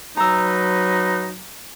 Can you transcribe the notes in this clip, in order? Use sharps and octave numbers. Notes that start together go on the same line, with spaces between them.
F#3 D#4 B4 A#5 E6